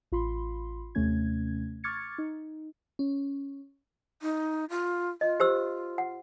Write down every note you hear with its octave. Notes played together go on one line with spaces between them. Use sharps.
A1 F4 B5 C6
D#2 C3 A3 C#4 G#6
C#6 D6 F6 G#6 A6 C#7
D#4
C#4
D#4
F4
F4 D#5
G4 C5 E6
F#5